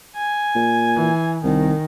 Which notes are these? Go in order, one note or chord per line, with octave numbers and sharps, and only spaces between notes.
G#5
A#2
E3
C2 D#3